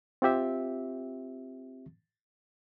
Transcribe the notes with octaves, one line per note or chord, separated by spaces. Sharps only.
C4 F4 G4 E5